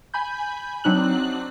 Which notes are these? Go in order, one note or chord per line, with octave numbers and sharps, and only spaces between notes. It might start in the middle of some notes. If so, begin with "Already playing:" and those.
G#5 B5 G6
F#3 C4 D4 D#4 F#6 F#7